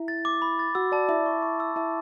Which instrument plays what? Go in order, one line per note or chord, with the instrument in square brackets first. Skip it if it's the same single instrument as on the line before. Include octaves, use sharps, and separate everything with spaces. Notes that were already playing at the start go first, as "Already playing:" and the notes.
Already playing: [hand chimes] E4 E5
[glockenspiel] A6
D6
B5
A6
[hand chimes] F#4 F#5 [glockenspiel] E6
[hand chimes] D5 [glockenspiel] A5
[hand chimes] E4 E5 [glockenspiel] A5
[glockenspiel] C#6
C#6
E6
[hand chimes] E4 E5 [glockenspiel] A5